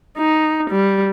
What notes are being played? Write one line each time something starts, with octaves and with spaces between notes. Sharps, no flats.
D#4
G3